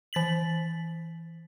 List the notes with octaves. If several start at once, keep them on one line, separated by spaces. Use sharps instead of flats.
E3 A6 B6 F#7